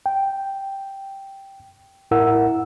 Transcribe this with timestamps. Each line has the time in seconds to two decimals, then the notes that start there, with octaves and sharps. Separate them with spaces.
0.06 G5
2.11 A2 E4 A#4 F#5 E6